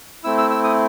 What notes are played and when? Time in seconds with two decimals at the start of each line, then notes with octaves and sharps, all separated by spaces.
0.24 A3 C4 E4 E6
0.38 E6
0.50 E6
0.64 D#6